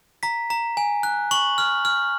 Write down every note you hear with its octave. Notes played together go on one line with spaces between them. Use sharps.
A#5 B6
A#5
G#5
F#6
C#6 F#7
F6
F6